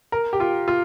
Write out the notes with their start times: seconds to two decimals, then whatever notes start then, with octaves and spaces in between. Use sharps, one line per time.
0.12 A#4
0.33 G4
0.40 F4
0.68 F4